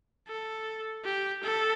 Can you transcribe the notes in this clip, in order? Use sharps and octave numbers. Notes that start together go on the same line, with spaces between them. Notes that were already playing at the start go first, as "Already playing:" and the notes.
A4
G4
A4